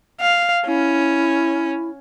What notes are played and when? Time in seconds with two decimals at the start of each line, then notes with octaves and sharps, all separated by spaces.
0.21 F5
0.67 C#4 E4